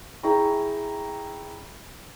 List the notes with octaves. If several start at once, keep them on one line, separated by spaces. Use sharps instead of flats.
E4 G#4 G5 A#5 B5 C#6